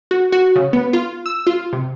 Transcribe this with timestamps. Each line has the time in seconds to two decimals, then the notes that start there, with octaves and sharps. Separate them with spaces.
0.11 F#4
0.32 F#4
0.56 C#3
0.73 B3
0.93 F4
1.26 E6
1.47 F4
1.73 C3